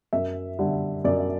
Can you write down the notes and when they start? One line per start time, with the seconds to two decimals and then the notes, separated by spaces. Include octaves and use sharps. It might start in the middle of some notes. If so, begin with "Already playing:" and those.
0.13 F#2 E5
0.59 D3 G3
1.05 F#2 D5